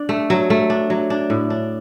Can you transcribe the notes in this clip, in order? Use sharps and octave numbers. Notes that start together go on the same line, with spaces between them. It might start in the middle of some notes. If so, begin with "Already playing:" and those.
Already playing: D4
A3
F#3
A3
D4
F#3
D4
A2
D4